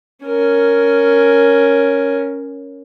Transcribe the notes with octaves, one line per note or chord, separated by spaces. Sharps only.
C#4 A#4